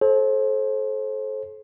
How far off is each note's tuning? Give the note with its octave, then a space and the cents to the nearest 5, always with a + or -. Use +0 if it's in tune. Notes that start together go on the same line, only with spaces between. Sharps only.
A4 -30 C5 +30